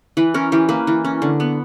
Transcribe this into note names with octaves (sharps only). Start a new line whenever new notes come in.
E3 B4
C#4 A#4
E3 G4
A#3 B4
E3
C#4
D3
B3